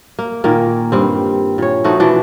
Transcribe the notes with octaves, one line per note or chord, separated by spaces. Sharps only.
A#3
A#2 D#3 A#3
G2 G3 C4
A#2 C#5
F3 A3 D#4 F#4
B2 E3 F3 D4